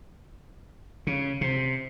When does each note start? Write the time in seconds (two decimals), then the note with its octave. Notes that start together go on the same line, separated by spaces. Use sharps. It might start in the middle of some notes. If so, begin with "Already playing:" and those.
1.07 C#3
1.41 C3